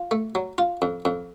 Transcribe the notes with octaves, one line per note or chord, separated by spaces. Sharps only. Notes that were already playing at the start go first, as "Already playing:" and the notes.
Already playing: F4
A3
F#3
F4
F2
F2